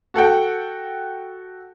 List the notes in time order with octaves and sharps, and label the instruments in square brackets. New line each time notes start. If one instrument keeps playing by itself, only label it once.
[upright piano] F#4 A4 F#5 G5